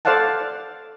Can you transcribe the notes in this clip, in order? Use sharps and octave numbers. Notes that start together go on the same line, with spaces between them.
A4 C5 D5 F5 F#5 A5